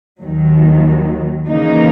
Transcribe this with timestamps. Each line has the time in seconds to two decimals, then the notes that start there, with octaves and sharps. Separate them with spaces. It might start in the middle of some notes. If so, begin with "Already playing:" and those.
0.21 D#2 D#3 F#3
1.48 C#3 E3 A#3 D#4